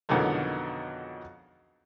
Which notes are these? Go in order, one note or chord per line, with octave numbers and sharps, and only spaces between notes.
F2 B2 D3 D#3 F#3 G#3